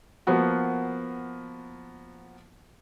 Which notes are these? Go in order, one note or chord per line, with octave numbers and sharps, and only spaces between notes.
F3 A#3 B3 F#4